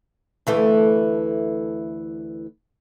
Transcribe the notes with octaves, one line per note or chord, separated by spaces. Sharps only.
D2 E3 A3